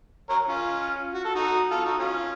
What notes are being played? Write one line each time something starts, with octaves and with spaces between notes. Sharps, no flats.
A#4 C#5
C#4 F4
F#4
A4
D#4 F#4
F4 A4
D#4 F#4
C#4 F4